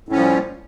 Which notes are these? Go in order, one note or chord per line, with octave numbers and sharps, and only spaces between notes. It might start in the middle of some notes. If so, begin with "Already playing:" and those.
A2 F3 G3 C#4